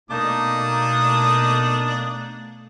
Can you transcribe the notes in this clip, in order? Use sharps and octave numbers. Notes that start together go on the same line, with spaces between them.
B2 A3 A#3 D4 D#4 A5 D#6